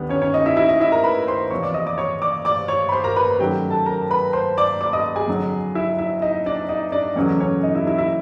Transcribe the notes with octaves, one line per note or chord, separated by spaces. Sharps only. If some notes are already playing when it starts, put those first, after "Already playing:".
Already playing: D#2 D3 G3 B3 B4
C#4 C#5
C#4 C#5
D#4 D#5
E4 E5
E4 E5
D#4 D#5
E4 E5
A#4 A#5
B4 B5
C5 C6
E2 C3 F3 C#5 C#6
D5 D6
D#5 D#6
D5 D6
C#5 C#6
D5 D6
D5 D6
C#5 C#6
B5
C5 C6
A#4 A#5
B4 B5
F#2 D#3 F#3 A3 G4 G5
A4 A5
A#4 A#5
B4 B5
C5 C6
D5 D6
D5 D6
D#5 D#6
G#4 G#5
F2 D3 F#3
E4 E5
E4 E5
D#4 D#5
D4 D5
D#4 D#5
D4 D5
E2 C#3 F#3 A3 C#4 C#5
C#4 C#5
D#4 D#5
E4 E5
E4 E5
E4 E5